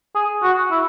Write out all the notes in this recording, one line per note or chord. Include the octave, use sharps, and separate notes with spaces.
G#4
F#4
E4